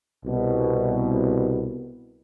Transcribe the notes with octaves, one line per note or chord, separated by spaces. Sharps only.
C2 B2